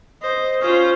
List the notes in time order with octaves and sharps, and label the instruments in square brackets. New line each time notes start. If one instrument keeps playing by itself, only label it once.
[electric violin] C5 [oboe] D#5
[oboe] C#4 [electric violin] F4 C5